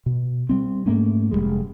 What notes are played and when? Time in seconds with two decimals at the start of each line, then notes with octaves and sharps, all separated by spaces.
0.06 B2
0.49 G3 G#3 C4
0.86 G#2 A3 A#3 C#4
1.31 F1 D#2 G3 G#3